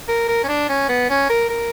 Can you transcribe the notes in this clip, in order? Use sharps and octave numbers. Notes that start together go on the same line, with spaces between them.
A#4
A#4
C#4
D4
C#4
B3
C#4
A#4
A#4